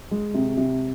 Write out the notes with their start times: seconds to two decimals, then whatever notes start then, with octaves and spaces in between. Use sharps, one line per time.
0.11 G#3
0.34 C3
0.57 C3